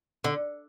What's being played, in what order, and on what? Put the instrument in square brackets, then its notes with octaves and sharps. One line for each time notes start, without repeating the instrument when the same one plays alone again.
[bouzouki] D3